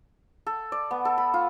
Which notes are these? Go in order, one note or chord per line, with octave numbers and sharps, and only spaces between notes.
A4
D5
B3
A4
B5
F4